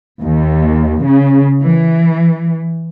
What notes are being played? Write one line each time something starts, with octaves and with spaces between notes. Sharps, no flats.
D#2
C#3
E3